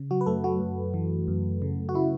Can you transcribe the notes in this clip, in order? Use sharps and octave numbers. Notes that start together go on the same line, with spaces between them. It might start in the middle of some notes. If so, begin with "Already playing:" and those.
Already playing: C#3
F#3 F#4
B4
F#2 A3 A4
F#3 F#4
F#2
E3
F#2
C#3
F#4
C#3 E4